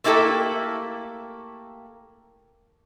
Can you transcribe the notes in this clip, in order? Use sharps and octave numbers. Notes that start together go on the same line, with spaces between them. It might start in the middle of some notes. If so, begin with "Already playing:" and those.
A3 A#3 E4 G4 A4